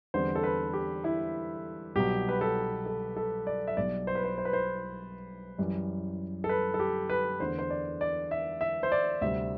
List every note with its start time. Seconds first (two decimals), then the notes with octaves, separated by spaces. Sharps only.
0.14 E2 D3 G3 C4 C5
0.35 A4
0.43 B4
0.73 G4
1.04 E4
1.95 C2 B2 F#3 G4
2.29 B4
2.41 A4
2.86 A4
3.17 A4
3.47 D5
3.67 E5
3.77 B1 B2 G3 D5
4.07 C5
4.15 B4
4.24 C5
4.38 C5
4.45 B4
4.53 C5
5.58 F#2 E3 G3
6.44 A4
6.49 B4
6.74 A4
6.80 G4
7.10 B4
7.40 E2 D3 A3 C5
7.58 C5
7.70 D5
8.01 D5
8.31 E5
8.61 E5
8.83 C5
8.92 D5
9.21 D2 C3 G3 C4 E5